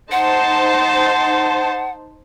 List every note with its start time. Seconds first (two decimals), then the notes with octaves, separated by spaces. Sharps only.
0.12 D#4 C5 F#5 A5